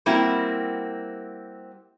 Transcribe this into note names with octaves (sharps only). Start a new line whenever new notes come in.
G3 A#3 C4 E4 F#4